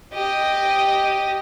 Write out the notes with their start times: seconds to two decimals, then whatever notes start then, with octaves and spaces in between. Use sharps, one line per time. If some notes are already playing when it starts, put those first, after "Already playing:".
0.13 G4 D#5